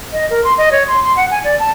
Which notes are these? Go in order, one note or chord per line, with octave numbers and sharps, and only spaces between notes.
D#5
A#4
C6
D#5
C#5
C6
C6
F#5
G#5
D5
A5